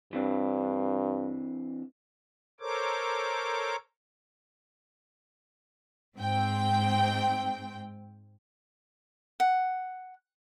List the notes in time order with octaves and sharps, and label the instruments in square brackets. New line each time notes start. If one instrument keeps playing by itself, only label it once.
[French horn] G2 [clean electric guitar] E3 C4 D4
[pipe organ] A4 A#4 C5 C#5 D6
[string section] G#2 C4 G5
[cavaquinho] F#5